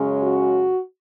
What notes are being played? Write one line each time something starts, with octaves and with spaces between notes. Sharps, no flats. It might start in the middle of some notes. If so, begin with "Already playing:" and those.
Already playing: F#2 C#3 G#3 C#4
F#4